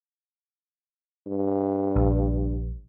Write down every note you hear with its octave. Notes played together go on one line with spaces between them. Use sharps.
G2
A#1